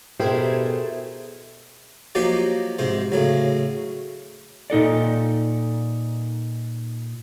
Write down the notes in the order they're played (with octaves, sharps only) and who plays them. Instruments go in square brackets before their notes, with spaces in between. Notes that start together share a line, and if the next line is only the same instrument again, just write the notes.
[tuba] B2 [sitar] A3 E4 [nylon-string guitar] G4 A#4 [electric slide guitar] G#4 C5
[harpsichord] F3 F#3 A#3 D#4 G4
G#2 C3 C5
A2 C#3 F#3
[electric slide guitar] A#2 D#4 A4 D5